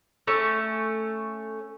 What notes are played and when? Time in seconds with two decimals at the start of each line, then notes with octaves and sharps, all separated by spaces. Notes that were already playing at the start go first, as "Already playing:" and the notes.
0.27 A3 C#4